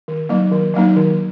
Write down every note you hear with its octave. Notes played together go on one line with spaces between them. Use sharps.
D#3
F#3 A#3 D#4
D#3
F#3 A#3 D#4
D#3